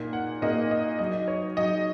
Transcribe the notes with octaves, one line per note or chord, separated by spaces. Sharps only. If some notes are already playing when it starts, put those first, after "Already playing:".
Already playing: A#2 A#3 D#4
F#5
A#2 A#3 D#4 D#5
D#5
F#3 D#4 D#5
C#5
F#3 D#4 D#5